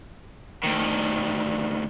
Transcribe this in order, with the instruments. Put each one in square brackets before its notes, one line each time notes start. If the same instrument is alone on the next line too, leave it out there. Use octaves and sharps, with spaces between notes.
[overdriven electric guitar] D2 D#3